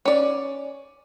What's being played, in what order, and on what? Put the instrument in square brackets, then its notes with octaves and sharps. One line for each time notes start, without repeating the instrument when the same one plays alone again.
[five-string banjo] C#4 D5